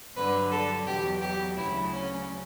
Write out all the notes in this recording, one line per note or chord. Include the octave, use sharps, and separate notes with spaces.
G2 D3 F#3 B4
A4
E2 B2 F#3 G4
G4
D2 C#3 F#3 E4
C#4